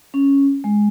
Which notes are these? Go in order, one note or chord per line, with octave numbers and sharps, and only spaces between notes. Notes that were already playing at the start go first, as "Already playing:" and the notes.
C#4
G#3